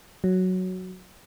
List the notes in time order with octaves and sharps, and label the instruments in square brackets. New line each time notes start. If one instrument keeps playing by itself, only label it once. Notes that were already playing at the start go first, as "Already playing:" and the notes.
[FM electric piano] F#3